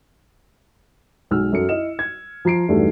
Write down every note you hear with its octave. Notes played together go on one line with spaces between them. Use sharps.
B1 G#3 E6 F6
F#2 A4 C#7
E4 D#5 E7
G#6
F3 A#5 C7 D7
E2 G2 F#3 G3 A3 D#4